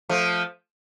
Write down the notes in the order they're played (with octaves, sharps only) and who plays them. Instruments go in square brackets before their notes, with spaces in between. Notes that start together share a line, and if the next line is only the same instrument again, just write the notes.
[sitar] F3 A3